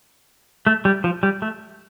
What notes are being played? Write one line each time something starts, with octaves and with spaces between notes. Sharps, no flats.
A3
G3
F3
G3
A3